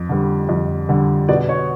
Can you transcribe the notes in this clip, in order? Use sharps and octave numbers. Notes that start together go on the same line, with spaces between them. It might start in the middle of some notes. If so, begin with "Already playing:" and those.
Already playing: F2
D3 G3
F2
D3 G3
B2 D5
C#5